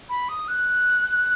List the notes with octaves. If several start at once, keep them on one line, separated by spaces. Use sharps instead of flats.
B5
D#6
F#6